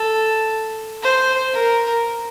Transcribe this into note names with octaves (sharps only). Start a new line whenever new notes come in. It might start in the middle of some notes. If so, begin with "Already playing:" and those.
Already playing: A4
C5
A#4